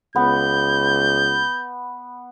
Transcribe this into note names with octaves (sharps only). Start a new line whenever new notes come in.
C#2 B3 G6